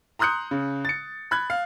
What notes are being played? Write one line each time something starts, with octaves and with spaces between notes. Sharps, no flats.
A#5 C6 D#6 F#6 G6 C#7
C#3
A6 C#7
B5 F#6 G#6
F5